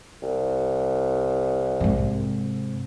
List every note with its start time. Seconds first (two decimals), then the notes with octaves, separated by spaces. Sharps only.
0.22 C2
1.80 G#2 C3